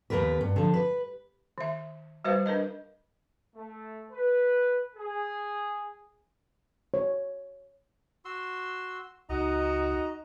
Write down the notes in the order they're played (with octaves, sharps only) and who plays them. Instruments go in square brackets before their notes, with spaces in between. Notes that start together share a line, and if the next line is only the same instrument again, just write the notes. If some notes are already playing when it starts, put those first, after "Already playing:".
[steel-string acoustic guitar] D#2 C#3 B3 A#4 B4
G2
D3 F3
B4
[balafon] D#3 E5
G3 F#4 B4 C5 F5
D4 A#4 B4 D#5
[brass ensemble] A3
B4
G#4
[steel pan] C#5
[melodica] F#4 C6 E6
[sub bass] C#2 [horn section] D#4 F#4 [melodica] D#5 A#5